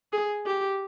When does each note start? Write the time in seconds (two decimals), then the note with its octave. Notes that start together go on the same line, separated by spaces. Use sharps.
0.13 G#4
0.46 G4